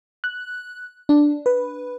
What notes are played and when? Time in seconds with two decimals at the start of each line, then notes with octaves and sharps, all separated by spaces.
0.24 F#6
1.09 D4
1.46 B4